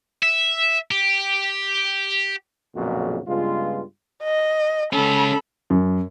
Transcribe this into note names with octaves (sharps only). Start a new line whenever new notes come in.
E5
G4
B1 F2 A#2 C#3 G#3 F#4
G2 C#3 G#3 B3 F4
D#5
C#2 C#4 A4 B5
F#2